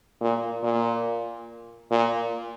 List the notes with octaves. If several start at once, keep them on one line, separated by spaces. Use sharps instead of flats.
A#2
A#2
A#2